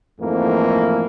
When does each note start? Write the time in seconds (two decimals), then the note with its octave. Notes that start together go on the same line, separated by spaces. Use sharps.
0.20 F2 G#2 E3 A3 A#3